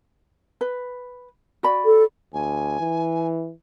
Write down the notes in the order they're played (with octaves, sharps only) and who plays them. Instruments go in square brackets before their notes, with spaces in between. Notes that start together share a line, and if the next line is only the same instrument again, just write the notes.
[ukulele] B4
F#4 D5 B5
[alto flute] A4
[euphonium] D2 [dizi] G#5
[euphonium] E3